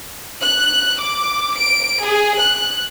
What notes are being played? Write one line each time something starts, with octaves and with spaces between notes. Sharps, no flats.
F#6
D6
D7
G#4
F#6